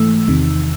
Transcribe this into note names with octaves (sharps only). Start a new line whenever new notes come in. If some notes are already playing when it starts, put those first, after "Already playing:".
Already playing: G#2 E3 A3 E6
E2 C3 D#3